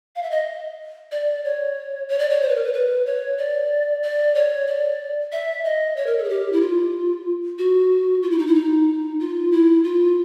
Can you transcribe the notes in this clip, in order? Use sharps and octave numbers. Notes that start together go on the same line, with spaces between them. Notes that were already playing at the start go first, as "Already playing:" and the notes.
F5
E5
D#5
D5
C#5
C#5
D5
C#5
C5
B4
A#4
B4
B4
C#5
D5
D5
C#5
D5
E5
D#5
C#5
A#4
A4
G#4
G4
E4
F4
F#4
F4
E4
D#4
E4
D#4
F4
E4
F4